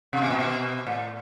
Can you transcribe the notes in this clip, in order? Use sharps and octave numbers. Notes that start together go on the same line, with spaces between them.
C3
B2
A#2
B2
A2